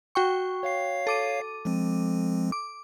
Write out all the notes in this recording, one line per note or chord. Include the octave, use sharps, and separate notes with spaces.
F#4 G5 C#6
C#5 F5 C7
A4 D6 D#7
F3 G#3 C4
D6